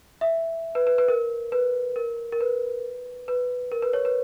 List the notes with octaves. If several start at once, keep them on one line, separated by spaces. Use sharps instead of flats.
E5
B4
B4
B4
A#4
B4
A#4
A#4
B4
B4
A#4
B4
C#5
B4